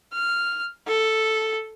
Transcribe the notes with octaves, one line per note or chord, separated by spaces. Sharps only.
F6
A4